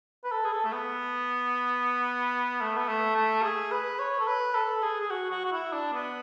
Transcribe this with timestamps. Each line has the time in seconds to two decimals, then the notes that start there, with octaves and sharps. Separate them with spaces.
0.24 B4
0.32 A4
0.45 G#4
0.52 A4
0.65 A3
0.73 B3
2.61 A3
2.77 B3
2.88 A3
3.16 A3
3.43 G#4
3.71 B4
3.99 C#5
4.20 A4
4.27 B4
4.55 A4
4.82 G#4
5.01 G#4
5.10 F#4
5.31 F#4
5.45 F#4
5.52 E4
5.73 D4
5.93 B3